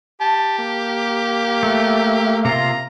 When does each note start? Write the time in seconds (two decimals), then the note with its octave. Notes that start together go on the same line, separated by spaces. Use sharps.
0.21 G4 A5
0.59 A#3
1.63 A3
2.45 C3 F4 A#5